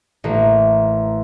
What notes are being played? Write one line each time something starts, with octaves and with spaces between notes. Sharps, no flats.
A1 A#3